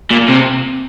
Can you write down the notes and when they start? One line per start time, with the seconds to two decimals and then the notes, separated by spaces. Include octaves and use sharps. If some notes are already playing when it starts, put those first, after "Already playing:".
0.11 A#2
0.29 C3